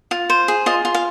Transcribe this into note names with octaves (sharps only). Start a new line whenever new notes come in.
F4
C5
G#4
F4 D#5
F4
F5